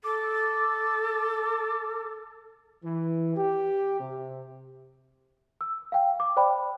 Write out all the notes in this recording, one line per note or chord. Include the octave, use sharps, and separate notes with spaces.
A4 D6
E3
G4
C3
E6
F5 G5
D6
C5 D5 G5 B5